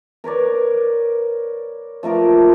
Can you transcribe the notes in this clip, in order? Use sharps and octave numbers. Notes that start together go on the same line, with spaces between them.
A#4 B4 C#5 D5
F3 A3 A#4 D5